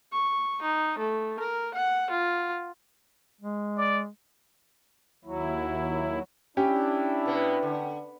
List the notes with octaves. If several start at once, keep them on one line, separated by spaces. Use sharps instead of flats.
C#6
D#4
A3
A#4
F#5
F4
G#3
D5
D#2 F#3 E4
C#4 D4 E4 G4 G5
B2 B3
D3